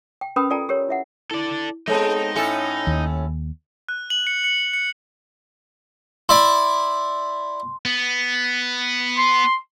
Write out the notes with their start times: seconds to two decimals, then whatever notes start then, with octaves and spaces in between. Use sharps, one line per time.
0.21 G5
0.36 C#4 A#4 B4 G5 B5 D#6
0.50 F4 A4 D5 G5 G#5 A#5
0.69 G4 A#4 C#5
0.89 E4 E5 F#5
1.31 E4 A4 D5
1.88 G#3 B3 C4 D#4 A4 C#5 A5
2.36 A2 C#4 A4 G#5
2.87 D#2
3.89 F#6
4.10 F#7
4.27 C#7
4.44 C#7
4.73 C#7
6.29 E4 D5 C6
7.85 B3
9.17 C6